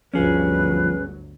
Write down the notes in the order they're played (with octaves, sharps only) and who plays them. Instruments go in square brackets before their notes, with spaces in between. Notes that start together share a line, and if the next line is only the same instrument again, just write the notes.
[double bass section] G1 D2 F#3 [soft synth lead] F3 [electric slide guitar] C#4 G#4 [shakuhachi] B4